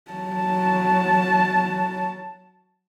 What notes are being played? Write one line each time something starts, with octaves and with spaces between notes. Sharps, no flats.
F#3 A5